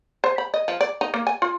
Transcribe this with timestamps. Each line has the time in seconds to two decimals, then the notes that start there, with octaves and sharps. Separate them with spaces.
0.24 C5
0.38 B5
0.54 D#5
0.68 F3
0.81 D5
1.01 D#4
1.14 A#3
1.27 G#5
1.42 F4